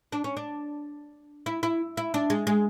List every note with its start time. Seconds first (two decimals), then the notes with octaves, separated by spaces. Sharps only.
0.12 D4
0.24 C#4
0.37 D4
1.46 E4
1.63 E4
1.97 E4
2.14 D4
2.30 G#3
2.47 G#3